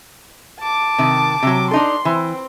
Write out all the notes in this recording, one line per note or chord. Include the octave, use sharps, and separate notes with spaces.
A5 D6
C3 D#3
C3 F#3
D4 D#4 A4 C6
E3 C4